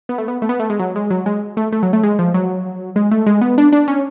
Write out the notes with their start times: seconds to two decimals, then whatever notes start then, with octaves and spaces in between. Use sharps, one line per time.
0.09 B3
0.18 A3
0.28 B3
0.42 A3
0.49 B3
0.60 A3
0.70 G#3
0.79 F#3
0.96 G#3
1.10 F#3
1.26 G#3
1.57 A3
1.72 A3
1.83 F#3
1.93 A3
2.03 G#3
2.19 F3
2.34 F#3
2.96 G#3
3.11 A3
3.26 G#3
3.41 B3
3.58 D4
3.72 D4
3.88 C#4